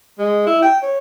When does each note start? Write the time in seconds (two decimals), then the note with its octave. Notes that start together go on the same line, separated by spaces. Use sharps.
0.19 G#3
0.47 E4
0.62 G5
0.83 C#5